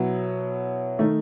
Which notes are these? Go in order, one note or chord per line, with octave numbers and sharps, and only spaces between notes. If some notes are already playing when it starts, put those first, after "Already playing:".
Already playing: B2 F#3 B3 E4
D#3 A3 D#4